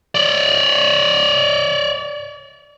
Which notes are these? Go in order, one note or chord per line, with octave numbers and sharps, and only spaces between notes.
C#5 D5